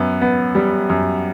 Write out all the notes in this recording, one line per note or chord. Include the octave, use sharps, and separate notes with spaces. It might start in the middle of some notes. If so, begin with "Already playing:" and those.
Already playing: F#2 B3
B3
G3
F#2